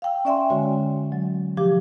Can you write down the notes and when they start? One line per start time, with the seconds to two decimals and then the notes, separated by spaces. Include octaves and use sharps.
0.02 F5 G5 E6
0.25 C#4 D5 E5 G5 G#5 C6
0.50 D3 G#3 F#4 C#5
1.12 F#3
1.57 C3 F3 G4 D6